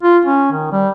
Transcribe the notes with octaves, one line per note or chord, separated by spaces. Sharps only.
F4
C#4
D#3
G3